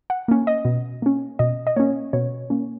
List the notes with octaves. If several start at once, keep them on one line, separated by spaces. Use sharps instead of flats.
F#5
A#3 C#4
D#5
B2
A#3 C#4
B2 D#5
D#5
A#3 C#4 C#5
B2 C#5
A#3 C#4